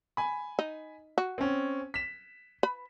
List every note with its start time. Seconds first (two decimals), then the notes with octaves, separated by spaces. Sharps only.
0.17 G#5 B5
0.59 D#4
1.18 F#4
1.38 C4 C#4
1.94 B6 E7
2.63 B4 B5